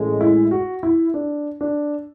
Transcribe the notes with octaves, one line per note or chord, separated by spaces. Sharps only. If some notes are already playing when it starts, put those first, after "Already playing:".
Already playing: A1 A2 G#3
E4
F#4
E4
D4
D4